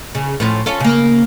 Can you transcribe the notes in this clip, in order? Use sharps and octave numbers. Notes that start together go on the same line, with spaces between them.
C#3
A2 F3 C#4
C#4 F4 A4
C#3 A#3